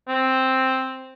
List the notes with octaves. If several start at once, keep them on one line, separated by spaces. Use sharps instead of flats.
C4